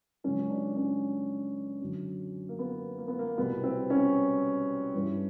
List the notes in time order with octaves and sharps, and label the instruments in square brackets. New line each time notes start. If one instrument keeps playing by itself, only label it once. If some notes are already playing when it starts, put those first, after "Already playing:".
[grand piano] C#2 C#3 F#3 C#4
D4
C#4
F#2 D3 F#3
A#3
B3
A#3
B3
A#3
C2 B2 G3 B3
C4
C#4
G2 E3 G3